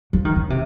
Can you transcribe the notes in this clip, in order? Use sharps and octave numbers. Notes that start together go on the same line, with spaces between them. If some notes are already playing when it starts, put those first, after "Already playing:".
F3
D#3
C#3
C3